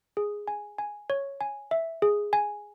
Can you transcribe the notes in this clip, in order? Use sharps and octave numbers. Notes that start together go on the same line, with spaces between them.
G#4
G#5
G#5
C#5
G#5
E5
G#4
G#5